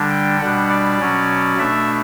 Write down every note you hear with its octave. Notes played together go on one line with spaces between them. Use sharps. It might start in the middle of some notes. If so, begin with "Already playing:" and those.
Already playing: D3 G3 D4
G5
B2 G3 D4 F#5
D5
B2 F#3 C#4
B2 A3 D4 E5